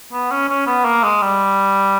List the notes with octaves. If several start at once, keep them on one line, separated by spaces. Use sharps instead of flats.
B3
C#4
C#4
B3
A#3
G#3
G3